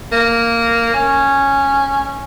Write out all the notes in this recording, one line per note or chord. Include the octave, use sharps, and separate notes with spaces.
A#3
C#4